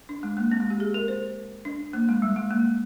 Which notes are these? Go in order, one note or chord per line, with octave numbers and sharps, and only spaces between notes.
D4
G#3
A#3
C4
G#3
G4
G#4
A#4
C5
D4
A#3
G#3
G3
G#3
A#3